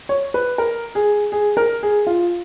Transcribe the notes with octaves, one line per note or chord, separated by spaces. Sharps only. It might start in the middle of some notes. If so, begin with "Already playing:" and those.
C#5
B4
A#4
G#4
G#4
A#4
G#4
F4